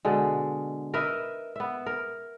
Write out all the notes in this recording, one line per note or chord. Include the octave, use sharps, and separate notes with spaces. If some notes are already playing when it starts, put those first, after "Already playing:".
B2 D3 G#3
A#4 B4 D#5 E5
B3 E5
A#4